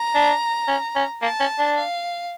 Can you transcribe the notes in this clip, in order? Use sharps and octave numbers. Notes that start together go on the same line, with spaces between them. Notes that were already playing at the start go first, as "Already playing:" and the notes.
Already playing: A#5
D4
C#4
C#4
A#3 A5
C#4
D4
F5